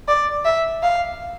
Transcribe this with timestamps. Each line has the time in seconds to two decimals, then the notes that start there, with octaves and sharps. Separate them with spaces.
0.08 D5
0.45 E5
0.83 F5